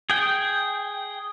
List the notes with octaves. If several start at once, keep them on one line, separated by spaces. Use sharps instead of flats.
G#4 G5